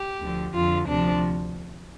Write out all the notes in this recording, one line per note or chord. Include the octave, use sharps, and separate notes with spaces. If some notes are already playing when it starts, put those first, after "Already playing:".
Already playing: G4
D2 D3 F3
F2 D3 F3 F4
D2 C3 F3 D4